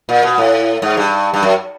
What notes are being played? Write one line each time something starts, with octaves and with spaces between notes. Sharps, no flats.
A#2
B2
A2
G#2
G2
G2
F#2